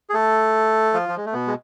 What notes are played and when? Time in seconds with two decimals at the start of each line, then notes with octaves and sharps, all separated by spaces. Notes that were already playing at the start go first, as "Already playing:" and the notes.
0.10 G#4
0.13 A3 A4
0.94 F3 F4
1.09 F3
1.17 G#3
1.26 A3
1.33 B2 B3
1.47 G#3